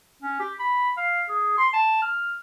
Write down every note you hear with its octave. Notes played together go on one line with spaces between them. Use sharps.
C#4
G4
B5
F5
G#4
C6
A5
F6